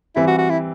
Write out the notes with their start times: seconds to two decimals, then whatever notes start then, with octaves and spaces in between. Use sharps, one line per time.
0.16 E3 G3 C4 E4
0.27 F#4
0.38 F#4
0.50 E4